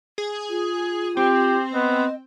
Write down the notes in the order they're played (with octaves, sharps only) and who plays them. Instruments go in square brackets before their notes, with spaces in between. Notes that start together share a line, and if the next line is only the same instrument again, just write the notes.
[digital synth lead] G#4
[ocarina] F4
[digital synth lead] C4 [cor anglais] G4
[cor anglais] B3 [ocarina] D#5